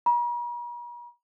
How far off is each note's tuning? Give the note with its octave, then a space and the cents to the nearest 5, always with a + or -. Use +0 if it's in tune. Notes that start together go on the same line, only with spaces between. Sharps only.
A#5 +45